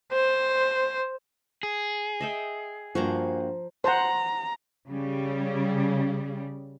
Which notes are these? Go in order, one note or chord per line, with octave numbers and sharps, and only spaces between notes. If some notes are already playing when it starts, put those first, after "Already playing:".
C5
G#4
D#5 E5 G5
G2 F3 A#3 F#4 C5 A#5
C5 F#5 A#5
C#3 G3